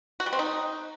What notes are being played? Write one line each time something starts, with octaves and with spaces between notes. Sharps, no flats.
F#4
G3
C4
D#4